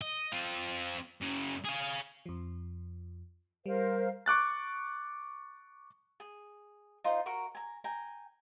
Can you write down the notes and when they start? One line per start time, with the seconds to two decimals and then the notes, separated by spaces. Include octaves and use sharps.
0.02 D#5
0.32 C4 F4
1.21 F#2 C#3
1.65 G#4 F5
2.26 F2 F3
3.66 G3 A#4 C5 F5
4.26 C#6 D6 F#6 A6
6.20 G#4
7.04 D#4 F4 C5
7.26 F#4 A#4 A#5 C#6
7.55 G#5 A#5
7.84 G5 G#5 A#5